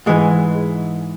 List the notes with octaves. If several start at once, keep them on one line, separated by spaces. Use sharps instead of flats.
G#2 E3 G#3